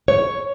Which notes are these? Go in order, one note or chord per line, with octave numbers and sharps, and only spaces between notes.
C#5